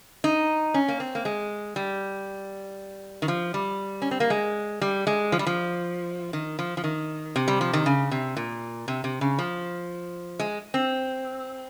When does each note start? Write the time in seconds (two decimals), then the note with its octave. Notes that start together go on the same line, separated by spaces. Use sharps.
0.24 D#4
0.74 C#4
0.88 A#3
1.00 C4
1.15 A#3
1.25 G#3
1.76 G3
3.22 D#3
3.28 F3
3.54 G3
4.02 C#4
4.11 C4
4.20 A#3
4.30 G#3
4.81 G3
5.07 G#3
5.32 F3
5.39 G3
5.47 F3
6.33 D#3
6.59 F3
6.77 F3
6.84 D#3
7.36 C3
7.48 G3
7.61 F3
7.73 D#3
7.86 C#3
8.11 C3
8.37 A#2
8.88 C3
9.04 C3
9.21 C#3
9.39 F3
10.39 G#3
10.74 C4